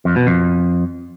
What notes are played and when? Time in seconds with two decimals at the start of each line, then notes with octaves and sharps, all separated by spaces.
0.05 F2
0.16 B2
0.27 F2